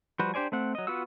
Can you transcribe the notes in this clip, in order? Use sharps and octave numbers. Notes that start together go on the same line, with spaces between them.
F3 G3 F#4 B4 C5
D4 G4 C5 D5 G#5
A3 C4 F#5
F#3 D#5
B3 F4 F#4 F#5 E6